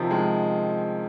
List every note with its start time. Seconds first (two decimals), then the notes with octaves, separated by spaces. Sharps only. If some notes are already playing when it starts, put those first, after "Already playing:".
Already playing: C3 D#3 F3
0.11 D#3 G#3